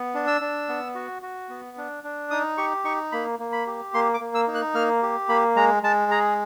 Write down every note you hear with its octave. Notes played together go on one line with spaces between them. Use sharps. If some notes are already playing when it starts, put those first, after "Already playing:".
Already playing: B3
D4
E6
D4
B3
F#4
F#4
B3
D4
D4
D#4 D#6
G4 C#6
D#4 C#6
A#3 B5
A#3
B5
G4
A#3 C6
D6
A#3
E6
D#4
F#6
A#3 F6
G4
A#3 B5
G#3 A#5
G#3 A5
G#4 A#5